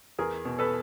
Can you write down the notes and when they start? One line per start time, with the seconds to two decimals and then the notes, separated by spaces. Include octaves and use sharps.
0.19 E2 G#4 A#4
0.45 B2
0.59 A4 B4